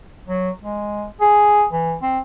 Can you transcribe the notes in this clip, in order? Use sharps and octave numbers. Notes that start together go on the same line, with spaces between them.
F#3
G#3
G#4
E3
C4